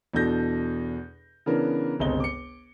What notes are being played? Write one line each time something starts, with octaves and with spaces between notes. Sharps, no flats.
E2 B2 D4 A4 G6 A#6
C#3 E3 B3 D4 A#4
G1 C#2 C3 D#5 G7
D6 C#7